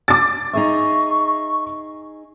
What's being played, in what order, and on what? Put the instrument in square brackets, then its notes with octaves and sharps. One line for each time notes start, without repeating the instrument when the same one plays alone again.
[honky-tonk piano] D6 A6
[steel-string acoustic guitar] D#4 G#4 E5 [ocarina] C#6